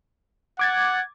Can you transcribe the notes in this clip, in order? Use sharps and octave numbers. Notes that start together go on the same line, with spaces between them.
F#5 D6 G#6 A6